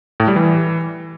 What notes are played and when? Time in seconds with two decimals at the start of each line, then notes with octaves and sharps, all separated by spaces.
0.20 A2
0.28 G3
0.36 E3